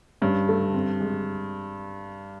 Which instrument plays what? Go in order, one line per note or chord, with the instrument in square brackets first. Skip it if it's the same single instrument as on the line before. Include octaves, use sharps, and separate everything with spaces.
[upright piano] G2 [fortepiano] C#4
[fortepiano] A3
C4
G#3